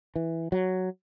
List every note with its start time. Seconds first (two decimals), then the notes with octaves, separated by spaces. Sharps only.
0.16 E3
0.52 F#3